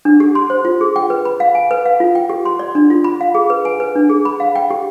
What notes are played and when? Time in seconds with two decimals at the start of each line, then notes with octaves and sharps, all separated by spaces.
0.05 D4
0.20 G4
0.35 C6
0.50 C5
0.65 F4
0.81 G#4
0.96 G5
1.10 B4
1.25 B5
1.40 F5
1.55 G#5
1.71 B4
1.85 F5
2.00 F4
2.15 G5
2.29 G4
2.45 C6
2.59 D5
2.75 D4
2.90 F4
3.04 B5
3.21 F5
3.35 G#4
3.50 B4
3.65 G#5
3.80 B4
3.95 D4
4.09 G#4
4.25 B5
4.40 F5
4.55 G5
4.70 G4